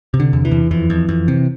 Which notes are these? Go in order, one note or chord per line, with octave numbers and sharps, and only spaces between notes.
C3
D3
E2
E3
E2
F2 E3
F2
F2
C3